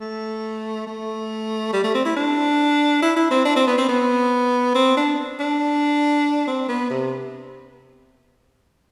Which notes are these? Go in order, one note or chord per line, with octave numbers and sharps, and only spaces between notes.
A3
A3
G3
A3
C4
E4
D4
E4
E4
C4
D4
C4
B3
C4
B3
C4
D4
D4
C4
B3
C3